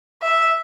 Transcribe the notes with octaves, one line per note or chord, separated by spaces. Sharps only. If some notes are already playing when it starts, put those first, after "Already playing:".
E5